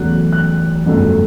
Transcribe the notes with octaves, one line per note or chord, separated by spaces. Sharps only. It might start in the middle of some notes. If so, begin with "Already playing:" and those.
Already playing: E2 C#3 F#3 A3 F#6
F#6
G1 F2 C#3 F#3 A3